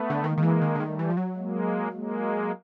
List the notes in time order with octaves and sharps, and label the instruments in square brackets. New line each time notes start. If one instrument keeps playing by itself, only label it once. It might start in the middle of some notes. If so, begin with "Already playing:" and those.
Already playing: [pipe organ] A3 B3
[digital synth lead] D3
[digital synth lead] D#3 [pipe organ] G#3 A#3
[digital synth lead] D#3
E3
D#3
D3
[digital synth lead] D#3 [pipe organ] G3 A3
[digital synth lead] E3
F3
F#3
[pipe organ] G#3 A#3
G#3 A#3